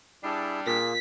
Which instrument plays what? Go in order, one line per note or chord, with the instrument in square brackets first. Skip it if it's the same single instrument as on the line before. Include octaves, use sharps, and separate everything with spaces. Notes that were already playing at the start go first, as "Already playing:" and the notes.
[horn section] G3 D4 [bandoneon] E4 G#4 A5
[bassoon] A#2 [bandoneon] A#3 F4 G#4 [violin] B6